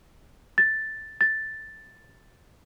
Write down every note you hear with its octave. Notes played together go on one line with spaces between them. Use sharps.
A6
A6